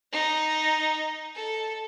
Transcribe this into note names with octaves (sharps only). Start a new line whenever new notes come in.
D#4
A4